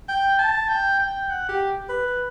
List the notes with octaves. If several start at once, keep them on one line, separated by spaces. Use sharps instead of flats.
G5
A5
G5
G5
F#5
G4
B4